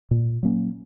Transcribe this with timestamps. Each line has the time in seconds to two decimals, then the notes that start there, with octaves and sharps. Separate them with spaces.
0.11 A#2
0.43 F#3 A#3 C#4